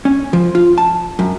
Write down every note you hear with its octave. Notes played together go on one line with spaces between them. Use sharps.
C#4
F3
F4
A5
F#2